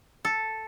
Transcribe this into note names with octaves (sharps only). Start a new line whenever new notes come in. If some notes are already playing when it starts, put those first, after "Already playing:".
A4